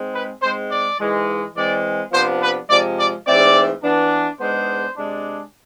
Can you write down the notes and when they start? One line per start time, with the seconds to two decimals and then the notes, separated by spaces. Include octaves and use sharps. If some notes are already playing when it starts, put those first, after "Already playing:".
Already playing: G#2 G#3 C4
0.13 B4
0.41 G#2 G#3 C4 C5
0.70 D5
0.99 G#2 E3 G#3
1.56 E3 G#3 C4 D5
2.12 C3 F3 B3 D4 C5
2.41 B4
2.69 C3 F3 G#3 D5
2.97 D5
3.25 G#2 E3 A3 C4 D5
3.83 E3 B3 D4
4.39 G#2 G#3 B3 D4 C5
4.95 C3 G#3 D4